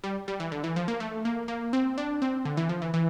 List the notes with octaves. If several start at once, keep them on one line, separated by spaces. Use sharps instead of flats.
G3
G3
E3
D3
E3
F3
A#3
A3
A#3
A#3
C4
D4
C4
D3
E3
F3
E3
E3